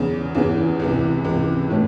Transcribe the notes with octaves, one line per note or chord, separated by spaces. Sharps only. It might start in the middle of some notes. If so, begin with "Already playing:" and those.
Already playing: E2 C#3 E3
E2 C#3 E3
C#2 C3 E3
C#2 C3 E3
A2 E3 A3 C#4